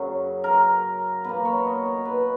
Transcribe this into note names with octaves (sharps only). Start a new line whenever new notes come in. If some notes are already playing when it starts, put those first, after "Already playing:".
Already playing: F#2 C#3 F#3
A#4
B2 A#3 B4
C#5
D#5
C#5
B4